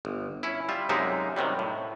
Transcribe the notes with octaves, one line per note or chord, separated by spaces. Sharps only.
G1
C#4 E4
G3 F4 E5
F#2 C3 G#3 A#3 D#4 E5
C3 D#3 F#3 G3
A2